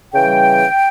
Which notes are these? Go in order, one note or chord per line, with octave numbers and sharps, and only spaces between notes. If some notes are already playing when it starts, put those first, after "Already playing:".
C#3 E3 G3 G5